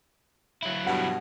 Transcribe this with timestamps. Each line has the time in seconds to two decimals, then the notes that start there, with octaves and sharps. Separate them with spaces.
0.63 F#3 E4
0.86 G2 B2 F#5